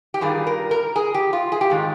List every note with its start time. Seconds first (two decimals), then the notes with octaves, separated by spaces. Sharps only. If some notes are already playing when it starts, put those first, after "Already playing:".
0.14 G4
0.21 G2 D#3 G3 D4 F4 G#4
0.47 A#4
0.71 A#4
0.96 G#4
1.14 G4
1.33 F4
1.52 G#4
1.61 G4
1.70 G#2 D#3 G#3 F4